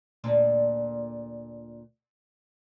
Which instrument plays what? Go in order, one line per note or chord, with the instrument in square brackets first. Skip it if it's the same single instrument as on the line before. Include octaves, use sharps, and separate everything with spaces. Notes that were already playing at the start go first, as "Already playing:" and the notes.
[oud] D2 A#2 D4